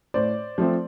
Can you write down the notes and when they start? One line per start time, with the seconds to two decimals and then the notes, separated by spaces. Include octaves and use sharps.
0.14 A2 C5 D5
0.58 F3 A3 C4